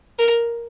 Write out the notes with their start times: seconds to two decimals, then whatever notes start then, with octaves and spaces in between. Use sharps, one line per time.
0.19 A#4